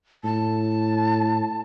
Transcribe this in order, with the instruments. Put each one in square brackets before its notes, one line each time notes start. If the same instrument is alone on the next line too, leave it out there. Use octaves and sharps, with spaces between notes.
[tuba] A2 [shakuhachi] A5